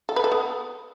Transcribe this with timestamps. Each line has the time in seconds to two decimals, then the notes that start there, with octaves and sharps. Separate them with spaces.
0.09 A4
0.16 B4
0.24 A4
0.32 B3